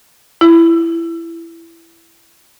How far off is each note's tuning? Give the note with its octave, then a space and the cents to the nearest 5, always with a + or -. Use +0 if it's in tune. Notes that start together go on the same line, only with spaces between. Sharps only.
E4 +15